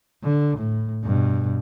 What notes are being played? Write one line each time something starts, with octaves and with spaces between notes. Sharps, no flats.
D3
A2
G2 B2